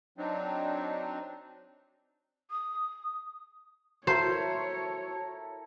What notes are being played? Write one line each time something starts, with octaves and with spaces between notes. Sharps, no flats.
F#3 C4 D4 D#4
D#6
E4 F#4 A4 A#4 C5 C#5